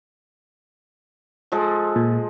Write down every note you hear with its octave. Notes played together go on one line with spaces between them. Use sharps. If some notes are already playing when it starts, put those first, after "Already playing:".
F3 G#3 A4
A#2